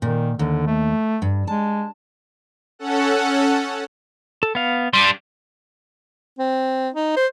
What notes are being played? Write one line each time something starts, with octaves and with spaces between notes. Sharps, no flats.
A#2 D#3
D#2 D3
A3
G2
G#3 A5
C#4 A4 F#5
A4
B3 F5
G3 D4 C6
C4
D#4
C5